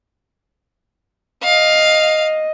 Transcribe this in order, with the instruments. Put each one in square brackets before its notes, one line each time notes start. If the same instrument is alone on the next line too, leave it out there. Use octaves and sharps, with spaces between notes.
[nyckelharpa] D#5 [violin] F5